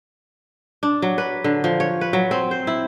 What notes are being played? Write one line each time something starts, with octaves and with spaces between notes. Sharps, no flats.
D4
F#3
B4
D3
F3
C#5
B4
F#3
C4
C5
E4